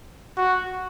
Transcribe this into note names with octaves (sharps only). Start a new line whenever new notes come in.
F#4